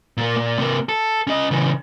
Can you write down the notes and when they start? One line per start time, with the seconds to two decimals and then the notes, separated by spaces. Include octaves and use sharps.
0.17 A#2 A#3
0.36 A#2
0.58 C3 A#3
0.89 A4
1.27 C#4 D#5
1.51 C#3 E3